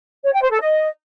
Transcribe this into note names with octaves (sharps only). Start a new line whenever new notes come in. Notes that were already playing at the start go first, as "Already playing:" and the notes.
C#5
G5
C5
A4
D#5